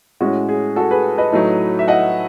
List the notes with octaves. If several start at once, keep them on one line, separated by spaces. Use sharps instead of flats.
A2 G#3 C#4 F#4
G#4
F#4 A4
G#4 B4
B4 D#5
A2 F#3 A3 D#4
E5
D#5 F#5